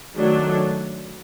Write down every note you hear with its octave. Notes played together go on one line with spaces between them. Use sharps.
D#3 F#3 A3 D4